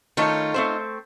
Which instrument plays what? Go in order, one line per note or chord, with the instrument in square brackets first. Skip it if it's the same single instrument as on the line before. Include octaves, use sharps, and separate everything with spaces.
[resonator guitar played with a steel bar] D#3 A3 [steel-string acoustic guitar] C#4 D#4 F4
[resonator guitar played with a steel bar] A3 C4 C5